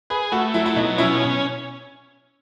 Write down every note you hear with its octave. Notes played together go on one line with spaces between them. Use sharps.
G#4 B4
A3 F#4
F#3 E4
E4
B2 D#4
C#4 E4